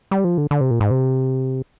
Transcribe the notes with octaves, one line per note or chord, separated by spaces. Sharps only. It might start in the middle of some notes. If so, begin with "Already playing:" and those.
G3
F3
D3
D3
C3
A#2
G#2
C3